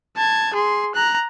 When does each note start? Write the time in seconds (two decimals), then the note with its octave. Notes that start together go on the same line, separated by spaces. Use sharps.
0.17 A5 G#6
0.54 G#4 C6
0.95 A#5 F#6